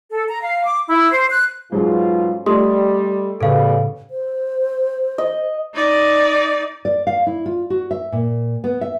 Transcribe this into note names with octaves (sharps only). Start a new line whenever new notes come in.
A4
A#5
F5
D6
E4
C5
F#6
G#2 B2 F#3 C#4 F4 A4 C5
G3 A3 D#5 C6 D#6
A2 C#3 G3 G#3 B3 A4 F5 C#6
C5
D#5
D#4 D5
D5
F5
E4
F4
F#4
E5
A#2
B3
E5